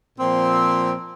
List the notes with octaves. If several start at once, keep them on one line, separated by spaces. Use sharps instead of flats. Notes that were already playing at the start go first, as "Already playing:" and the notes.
A#2 F3 C4